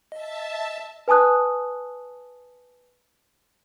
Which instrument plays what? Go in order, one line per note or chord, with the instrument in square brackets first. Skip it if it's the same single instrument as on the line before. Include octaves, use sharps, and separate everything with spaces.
[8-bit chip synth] D#5 [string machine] E5 A5
[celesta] B4 G#5 A5 D#6 F#6